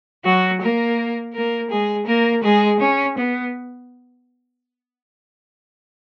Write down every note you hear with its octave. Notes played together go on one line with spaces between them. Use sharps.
F#3 F#4
A#3 A#4
A#3 A#4
G#3 G#4
A#3 A#4
G#3 G#4
C#4
B3